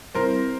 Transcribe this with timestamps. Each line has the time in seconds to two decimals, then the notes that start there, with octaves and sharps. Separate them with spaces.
0.14 G3 C4 E4 A#4 C5